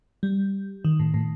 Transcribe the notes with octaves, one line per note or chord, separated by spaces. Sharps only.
G3
D#3
A2
A2